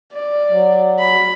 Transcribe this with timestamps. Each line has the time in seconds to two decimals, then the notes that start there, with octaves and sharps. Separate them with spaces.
0.13 D5
0.49 F#3
0.99 B5